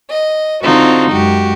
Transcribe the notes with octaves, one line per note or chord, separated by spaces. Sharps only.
D#5
D3 C4 D#4 F4 F#4
F#2 G#3 F#4 G4